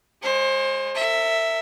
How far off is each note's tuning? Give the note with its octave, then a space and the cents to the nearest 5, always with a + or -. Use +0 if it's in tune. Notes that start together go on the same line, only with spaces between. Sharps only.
G#3 -10 C5 +30
A#4 -45 E5 +0